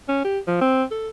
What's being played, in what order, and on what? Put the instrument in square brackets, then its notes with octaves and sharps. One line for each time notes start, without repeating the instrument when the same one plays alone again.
[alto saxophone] C#4
G4
F3
C4
A4